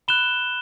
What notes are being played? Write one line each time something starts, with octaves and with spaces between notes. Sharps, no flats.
B5 F#6 E7 G7